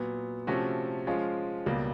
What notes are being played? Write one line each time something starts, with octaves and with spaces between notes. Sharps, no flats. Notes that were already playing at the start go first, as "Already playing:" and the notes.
Already playing: A#2 F#3 B3
C3 F3 A3 C#4 F#4
F3 G#3 C#4 F4
C#2 B2 G3 A#3